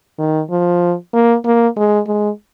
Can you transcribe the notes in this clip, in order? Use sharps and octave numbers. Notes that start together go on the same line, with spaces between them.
D#3
F3
A#3
A#3
G#3
G#3